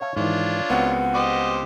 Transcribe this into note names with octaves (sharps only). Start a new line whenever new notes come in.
C#5 E5 F5 A5
G#2 D#3 E3 D4 F4 C#5
C#2 B3 C4 F#4 A#4 F#5
G4 C5 D#5